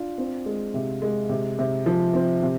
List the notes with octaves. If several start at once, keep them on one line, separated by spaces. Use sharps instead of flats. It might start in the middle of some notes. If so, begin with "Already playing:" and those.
Already playing: D4 F4
C4
G#3
C3
G#3
C3
C3
F3
C4
C3